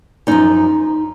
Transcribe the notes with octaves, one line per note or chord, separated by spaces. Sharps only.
F#2 F3 D#4